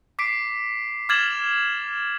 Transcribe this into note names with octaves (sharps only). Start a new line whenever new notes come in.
D6 B6 C7 D7
D6 F6 G#6 A6 E7 F#7